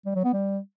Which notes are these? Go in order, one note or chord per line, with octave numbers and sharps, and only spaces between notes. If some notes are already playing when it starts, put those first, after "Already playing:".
G3
F#3
B3
G3